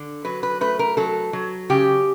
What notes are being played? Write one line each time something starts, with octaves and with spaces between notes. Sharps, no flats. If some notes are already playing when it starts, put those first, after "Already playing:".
Already playing: D3
F#3 B4
B4
A3 B4
A#4
F#3 A4
F#3
C#3 G4